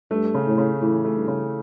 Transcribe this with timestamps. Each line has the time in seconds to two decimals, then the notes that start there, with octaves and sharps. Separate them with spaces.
0.11 G2 A3
0.34 C#3
0.46 A2
0.58 C#3
0.81 A2 E3
1.05 A3
1.16 G2
1.28 C#3